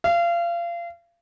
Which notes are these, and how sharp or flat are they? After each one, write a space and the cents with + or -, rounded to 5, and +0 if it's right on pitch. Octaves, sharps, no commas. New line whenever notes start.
F5 -30